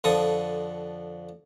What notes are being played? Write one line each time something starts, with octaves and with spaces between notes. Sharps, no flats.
F2 D3 F3 A4 D#6